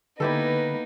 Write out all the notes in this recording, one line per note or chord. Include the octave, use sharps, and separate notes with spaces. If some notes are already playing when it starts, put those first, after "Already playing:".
D3 A#3 B3 D#4 E4 G4 A4 B4